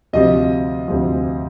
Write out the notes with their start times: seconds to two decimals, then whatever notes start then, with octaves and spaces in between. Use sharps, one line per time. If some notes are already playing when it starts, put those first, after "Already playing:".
0.13 D2 C3 F3 D#5
0.88 D2 C3 F3